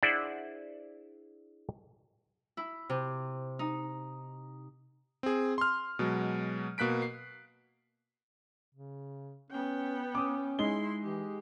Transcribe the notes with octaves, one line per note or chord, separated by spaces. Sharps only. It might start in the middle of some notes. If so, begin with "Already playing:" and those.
D4 E4 G#4 C5 D5 F#5
E4
C3
D#4
C4 G#4
C6 F6
B2 F#3 G#3
B2 A#3 F#6 B6 D7
C7
C#3
B3 C#4 G5
C#4 D6 D#6
G#3 D#4 E4 C6 G7
E3 G4